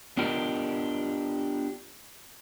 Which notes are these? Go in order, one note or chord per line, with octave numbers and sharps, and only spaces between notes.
B3 D4 F4 G4 A#4 D#5